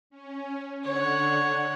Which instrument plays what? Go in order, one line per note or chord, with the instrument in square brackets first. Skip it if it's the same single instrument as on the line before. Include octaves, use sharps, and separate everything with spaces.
[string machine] C#4
[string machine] D3 F#5 [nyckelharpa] C#5